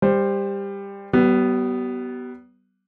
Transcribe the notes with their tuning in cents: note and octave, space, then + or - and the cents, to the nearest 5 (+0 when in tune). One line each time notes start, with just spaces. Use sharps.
G3 +20 C5 +0
G3 -40 B3 +0